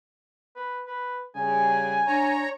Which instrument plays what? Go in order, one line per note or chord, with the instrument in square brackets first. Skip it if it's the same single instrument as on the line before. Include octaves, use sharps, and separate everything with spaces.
[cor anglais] B4
B4
[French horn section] C#3 G3 [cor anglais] G#5
[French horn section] D4 [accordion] C#5 A#5